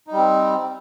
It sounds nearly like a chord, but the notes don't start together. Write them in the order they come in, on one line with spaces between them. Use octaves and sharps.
D#4 G3 C4